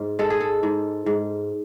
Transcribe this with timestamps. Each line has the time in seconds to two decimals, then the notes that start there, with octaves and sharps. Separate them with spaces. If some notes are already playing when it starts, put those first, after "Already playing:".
Already playing: G#2
0.19 G#3 A4
0.30 G#4
0.40 A4
0.63 G#2
1.06 G#2